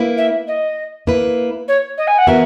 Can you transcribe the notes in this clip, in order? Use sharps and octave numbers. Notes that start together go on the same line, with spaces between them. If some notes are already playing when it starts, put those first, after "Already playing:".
Already playing: A#3 E4 B4
E5
D#5
A#3 E4 B4
C#5
D#5
G#5
F#5
E3 B3 F#4 A#4 E5